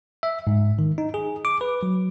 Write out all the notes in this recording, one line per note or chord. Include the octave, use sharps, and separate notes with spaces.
E5
G#2
D#3
D#4
G#4
D6
B4
F#3